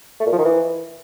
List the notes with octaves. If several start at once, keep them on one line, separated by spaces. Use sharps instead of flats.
A3
A#2
F3
D#3
E3